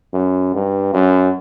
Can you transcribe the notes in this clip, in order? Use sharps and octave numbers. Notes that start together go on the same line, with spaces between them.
F#2
G2
F#2